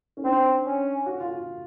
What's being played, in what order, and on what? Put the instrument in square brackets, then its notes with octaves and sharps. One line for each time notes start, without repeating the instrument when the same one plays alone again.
[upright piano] C#4
[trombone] C4 [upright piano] D4
[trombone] C#4
[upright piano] F#4
F4